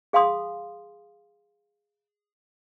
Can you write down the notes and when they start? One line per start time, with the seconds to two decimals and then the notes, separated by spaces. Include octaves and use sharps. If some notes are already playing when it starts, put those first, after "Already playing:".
0.13 G#4 F5 G#5 C6 D#6